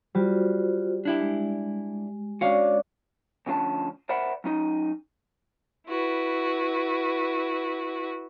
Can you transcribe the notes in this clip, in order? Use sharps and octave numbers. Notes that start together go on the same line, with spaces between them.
G3 F4 F#4 C5
D4 E4 G4
G#3
C#4 D4 F#4 F5 D6
D2 B2 F3 C#4 D4 A5
A#4 C5 D5 E5 F#5 B5
F#3 C#4 D#4
E4 F#4 B4